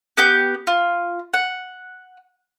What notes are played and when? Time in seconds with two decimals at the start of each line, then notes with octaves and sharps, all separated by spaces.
0.17 B3 G4 G6
0.67 F4
1.34 F#5